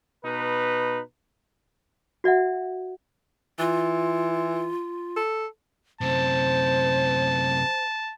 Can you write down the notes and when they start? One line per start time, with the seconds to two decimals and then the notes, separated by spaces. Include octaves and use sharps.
0.23 B2 D#4 B4
2.24 F#4 D5 E5 F#5
3.59 E3 F4
5.16 A4
6.01 F#2 C3 C5 A5